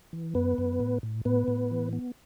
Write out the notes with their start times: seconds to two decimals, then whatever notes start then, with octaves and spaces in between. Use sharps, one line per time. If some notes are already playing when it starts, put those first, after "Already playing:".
0.13 E3
0.35 F#2 B3 B4
0.58 F#2
0.80 A2
1.03 A2
1.25 A2 B3 B4
1.48 A2
1.71 E3
1.93 B3